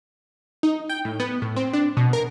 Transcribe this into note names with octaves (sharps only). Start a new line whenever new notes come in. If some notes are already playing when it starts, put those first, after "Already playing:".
D#4
G5
A2
B3
A2
C4
D4
B2
A#4